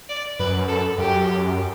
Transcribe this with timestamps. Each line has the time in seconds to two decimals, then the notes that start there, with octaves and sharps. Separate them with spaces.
0.09 D5
0.39 F#2 B4
0.68 A4
0.98 F#2 G4